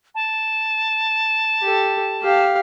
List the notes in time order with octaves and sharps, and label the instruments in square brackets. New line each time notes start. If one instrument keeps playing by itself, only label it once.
[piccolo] A5
[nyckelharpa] G4 A4
G4 F5